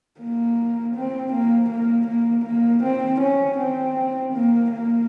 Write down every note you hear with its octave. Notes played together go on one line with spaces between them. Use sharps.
A#3
C4
A#3
A#3
A#3
A#3
C4
C#4
C4
A#3
A#3